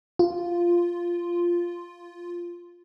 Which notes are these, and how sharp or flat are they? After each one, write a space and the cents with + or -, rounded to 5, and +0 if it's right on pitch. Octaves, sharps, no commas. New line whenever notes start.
F4 -5